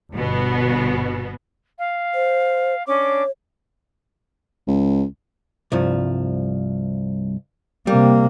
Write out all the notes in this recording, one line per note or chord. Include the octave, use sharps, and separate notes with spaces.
G1 B2 B3
F5
C5
C#4 D4 C#5 D6
C#2
C2 G2 F3
C3 G3 A#3